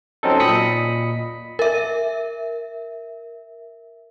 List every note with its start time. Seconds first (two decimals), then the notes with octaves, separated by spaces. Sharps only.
0.23 F#3 C4 C#4 D#4 A4
0.40 A#2 D#5 B5 D#6 B6 C#7
1.59 A#4 E5